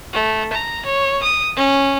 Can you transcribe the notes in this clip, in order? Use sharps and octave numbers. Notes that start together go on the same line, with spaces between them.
A3
A#5
C#5
D#6
C#4